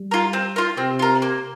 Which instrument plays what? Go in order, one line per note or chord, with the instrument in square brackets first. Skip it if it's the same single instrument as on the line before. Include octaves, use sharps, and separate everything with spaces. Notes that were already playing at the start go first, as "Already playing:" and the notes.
Already playing: [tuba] G3
[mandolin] F4 A#4
C4
F4 A#4
[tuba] C3 [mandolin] C4
[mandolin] F4 A#4
A#3